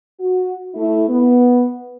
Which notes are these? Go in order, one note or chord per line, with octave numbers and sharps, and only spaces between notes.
F#4
A3 E4
B3